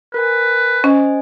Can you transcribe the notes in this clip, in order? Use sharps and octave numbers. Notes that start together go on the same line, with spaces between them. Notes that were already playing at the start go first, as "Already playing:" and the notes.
A#4 B4 G#5
C#4 C5 D#5 G#5